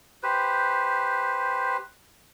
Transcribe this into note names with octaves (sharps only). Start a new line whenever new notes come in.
G4 B4 C5